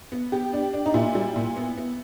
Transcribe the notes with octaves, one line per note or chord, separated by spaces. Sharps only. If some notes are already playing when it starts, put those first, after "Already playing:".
B3
B3 G4
D4
D4
D#4
A#2 E4
G3
A#2
B3
B3